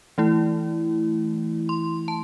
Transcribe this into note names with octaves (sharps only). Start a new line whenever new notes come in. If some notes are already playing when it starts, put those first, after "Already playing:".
E3 A3 E4
C6
A5